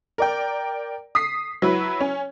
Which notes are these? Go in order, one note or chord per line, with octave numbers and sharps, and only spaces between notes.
A#4 D5 G5
D#6 B6 C7
F#3 E4 B4
C#4